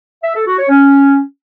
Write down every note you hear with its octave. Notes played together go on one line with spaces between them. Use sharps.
E5
A4
F#4
C#5
C#4